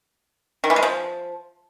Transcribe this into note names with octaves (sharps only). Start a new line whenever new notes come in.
D#3
E3
G#3
F3